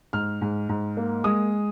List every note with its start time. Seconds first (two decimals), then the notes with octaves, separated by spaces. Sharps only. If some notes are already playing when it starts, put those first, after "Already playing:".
0.13 G#2 F6
0.41 G#2
0.69 G#2
0.97 A#3
1.24 G#3 D#6